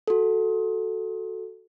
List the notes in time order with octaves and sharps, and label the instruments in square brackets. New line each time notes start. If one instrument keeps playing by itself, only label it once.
[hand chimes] F#4 A4